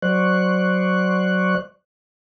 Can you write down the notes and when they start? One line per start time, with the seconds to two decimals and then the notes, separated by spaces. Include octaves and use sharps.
0.02 F#3 C5 D5 C#6 F#6